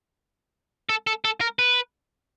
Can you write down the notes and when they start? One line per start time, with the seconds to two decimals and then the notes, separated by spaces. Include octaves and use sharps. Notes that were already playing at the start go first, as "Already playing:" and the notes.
0.89 A4
1.07 A4
1.25 A4
1.41 A#4
1.59 B4